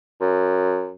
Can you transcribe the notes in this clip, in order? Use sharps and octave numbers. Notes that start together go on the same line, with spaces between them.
F#2